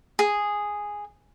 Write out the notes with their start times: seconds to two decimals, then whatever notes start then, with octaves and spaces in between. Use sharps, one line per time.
0.19 G#4